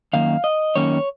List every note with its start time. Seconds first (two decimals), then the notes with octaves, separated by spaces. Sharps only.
0.13 F#2 D#3 A#3 F5
0.44 D#5
0.76 F#2 D#3 A#3 C#4 C#5